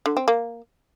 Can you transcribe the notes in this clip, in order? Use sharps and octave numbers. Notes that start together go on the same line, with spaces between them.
D3
C4
A#3